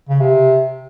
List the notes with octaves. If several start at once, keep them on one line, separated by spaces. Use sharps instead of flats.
C#3
C3